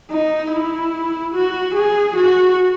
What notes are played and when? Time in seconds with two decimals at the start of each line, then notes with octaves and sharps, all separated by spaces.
0.11 D#4
0.52 E4
1.34 F#4
1.75 G#4
2.16 F#4